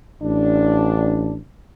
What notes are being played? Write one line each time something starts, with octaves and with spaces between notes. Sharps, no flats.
A1 D4